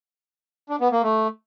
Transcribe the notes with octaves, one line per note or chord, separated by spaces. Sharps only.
D4
B3
A#3
A3